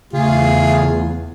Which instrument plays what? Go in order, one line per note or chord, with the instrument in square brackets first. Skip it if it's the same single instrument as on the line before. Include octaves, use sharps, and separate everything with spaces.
[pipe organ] E2 [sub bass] C#3 [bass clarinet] A3 [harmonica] F4 G#4